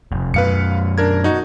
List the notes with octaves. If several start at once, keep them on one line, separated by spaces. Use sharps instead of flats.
F1
F#2 B2 B4 F5 C#7
D4 A#4 G#6
D#4 F#4